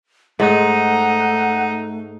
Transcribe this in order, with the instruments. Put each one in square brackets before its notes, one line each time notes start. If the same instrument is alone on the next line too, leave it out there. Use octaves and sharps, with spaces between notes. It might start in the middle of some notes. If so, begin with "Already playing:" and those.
[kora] G#2 [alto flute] A3 [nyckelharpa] D#4 [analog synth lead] F#5